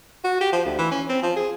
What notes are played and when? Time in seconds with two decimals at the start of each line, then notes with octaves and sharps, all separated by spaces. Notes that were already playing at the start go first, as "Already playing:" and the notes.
0.24 F#4
0.41 G4
0.52 F3
0.65 D2
0.79 E3
0.91 C#4
1.09 C4
1.23 F3
1.36 G#4